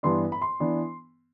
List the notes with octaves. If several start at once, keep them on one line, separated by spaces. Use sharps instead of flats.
G2 E3 B3 D4 C6
B5
C6
E3 B3 D4